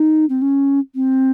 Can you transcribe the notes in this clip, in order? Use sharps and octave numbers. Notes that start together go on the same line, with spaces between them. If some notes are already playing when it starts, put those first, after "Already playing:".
Already playing: D#4
C4
C#4
C4